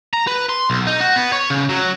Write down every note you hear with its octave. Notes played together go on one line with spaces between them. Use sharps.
A#5
B4
C6
B1
D#4
F#4
B3
C#5
C#3
F#3